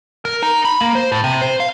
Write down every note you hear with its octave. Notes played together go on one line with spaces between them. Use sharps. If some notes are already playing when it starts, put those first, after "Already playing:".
A#4
D#4
B5
A#3
C5
A2
C3
C5
F5